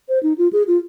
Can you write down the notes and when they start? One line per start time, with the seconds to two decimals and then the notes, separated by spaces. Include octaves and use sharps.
0.09 C5
0.23 D#4
0.38 F4
0.53 G#4
0.68 F4